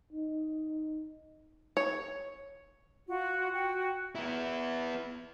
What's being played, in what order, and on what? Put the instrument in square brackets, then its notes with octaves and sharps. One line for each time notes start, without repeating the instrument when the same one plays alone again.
[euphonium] D#4
[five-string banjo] C#5
[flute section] F4 F#4
F#4 G5
[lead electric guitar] B3 E4